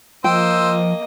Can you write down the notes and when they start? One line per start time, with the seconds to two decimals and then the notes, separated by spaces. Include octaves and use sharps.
0.24 F3 A#3 C5 D#5 G5 E6